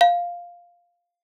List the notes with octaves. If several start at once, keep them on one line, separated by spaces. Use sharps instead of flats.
F5